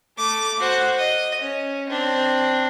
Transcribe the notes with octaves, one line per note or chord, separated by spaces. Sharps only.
A3 D6
F#4 C5
D#5
C#4
C4 D4